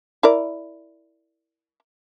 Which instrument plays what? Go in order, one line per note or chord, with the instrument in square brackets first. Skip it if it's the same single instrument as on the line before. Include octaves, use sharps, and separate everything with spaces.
[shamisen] E4 A#4 D5